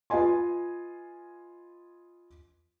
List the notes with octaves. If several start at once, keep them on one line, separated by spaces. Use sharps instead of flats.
F4 B4 D#5 G#5 C6